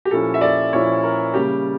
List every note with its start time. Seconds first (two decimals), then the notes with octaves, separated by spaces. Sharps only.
0.05 G4
0.11 A#2 F3 C#4 E4 A4
0.34 E5
0.41 D5
0.73 A#2 F3 C#4 E4 C#5
1.03 A#4
1.34 C#3 G3 A#3 G4